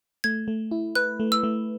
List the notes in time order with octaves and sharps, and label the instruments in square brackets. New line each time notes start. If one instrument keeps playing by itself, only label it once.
[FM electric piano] A3 [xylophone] G#6
[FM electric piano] A3
E4
[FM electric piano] B4 [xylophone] F#6
[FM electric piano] A3
[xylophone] E6
[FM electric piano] A3